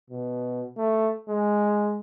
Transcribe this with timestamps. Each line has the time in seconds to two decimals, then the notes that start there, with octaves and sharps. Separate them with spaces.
0.10 B2
0.77 A3
1.28 G#3